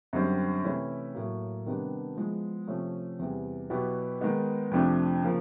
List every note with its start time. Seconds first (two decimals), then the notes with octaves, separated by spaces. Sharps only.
0.13 F#2 D3 G3 C4
0.64 C3 E3 A3 C#4 E4
1.15 A2 F#3 A#3
1.66 C3 D#3 G3 B3 D4
2.16 F3 G#3 B3 E4
2.67 C3 F3 A3 C#4
3.19 E2 C3 E3 G3
3.70 B2 F#3 B3 E4 G4
4.21 D#3 G#3 B3 D#4
4.71 F2 C3 F3 A3 D4
5.23 C#3 F3 A#3